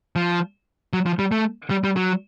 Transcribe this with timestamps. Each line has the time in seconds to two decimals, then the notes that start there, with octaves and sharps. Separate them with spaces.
0.16 F3
0.93 F#3
1.06 F3
1.19 G3
1.32 A3
1.70 G3
1.84 G3
1.96 F#3